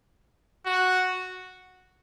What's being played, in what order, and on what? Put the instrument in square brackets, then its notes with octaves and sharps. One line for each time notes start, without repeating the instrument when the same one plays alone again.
[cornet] F#4